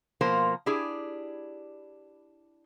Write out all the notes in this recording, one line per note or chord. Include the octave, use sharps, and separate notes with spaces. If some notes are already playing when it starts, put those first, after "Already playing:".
B2 F3 A#3 A#4 C5
D4 E4 G4 G#4